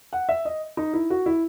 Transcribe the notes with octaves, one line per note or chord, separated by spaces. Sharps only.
F#5
E5
D#5
D#4
E4
F#4
E4